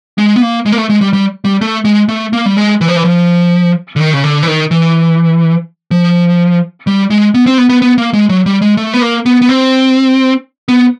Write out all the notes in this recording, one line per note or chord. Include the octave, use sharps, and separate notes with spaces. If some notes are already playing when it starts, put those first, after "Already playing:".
G#3
B3
A#3
G#3
A#3
A3
G#3
G3
G3
G3
A3
G#3
A3
A#3
G3
G#3
E3
F3
E3
F3
D3
D#3
C#3
D3
E3
D#3
E3
F3
G3
G#3
B3
C4
B3
B3
B3
A#3
G#3
F#3
G3
G#3
A3
B3
A#3
B3
B3
C4
B3